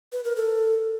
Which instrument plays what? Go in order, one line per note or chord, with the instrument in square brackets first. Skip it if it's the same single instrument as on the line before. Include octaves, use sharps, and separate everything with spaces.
[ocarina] B4
A#4
A4